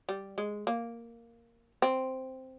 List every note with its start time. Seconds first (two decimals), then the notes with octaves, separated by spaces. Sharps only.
0.09 G3
0.38 G#3
0.67 A#3
1.82 C4